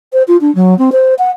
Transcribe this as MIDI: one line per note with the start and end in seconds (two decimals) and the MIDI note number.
0.13 0.23 72
0.28 0.37 65
0.41 0.53 62
0.55 0.77 54
0.78 0.90 60
0.92 1.14 72
1.19 1.31 78